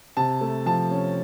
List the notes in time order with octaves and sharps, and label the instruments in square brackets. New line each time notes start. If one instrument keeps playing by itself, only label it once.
[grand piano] C3 A5
A3
F3 A5
C#4